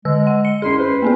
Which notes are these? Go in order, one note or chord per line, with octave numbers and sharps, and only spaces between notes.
D3 G#3 E6
F#5
C#7
F#2 C#4 E4 G#4 C6
B4 C5
A#3 B3 G#4